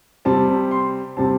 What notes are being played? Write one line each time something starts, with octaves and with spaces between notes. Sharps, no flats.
C3 G3 C4 A5
C6
C3 G3 C4 A5